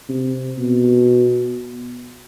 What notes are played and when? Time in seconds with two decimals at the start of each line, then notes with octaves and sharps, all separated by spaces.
0.09 C3
0.58 B2